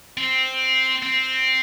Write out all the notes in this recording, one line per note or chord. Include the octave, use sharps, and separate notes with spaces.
C4
C4